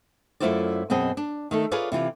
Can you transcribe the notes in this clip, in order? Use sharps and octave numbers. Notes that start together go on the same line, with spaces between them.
F#2 A3 E4 F4 C5 D5
F#2 B2 C4 G#4 D#5
D4
D#3 A3 A4
F4 G#4 A#4 B4 C#5 D5
C3 E3 F4 G4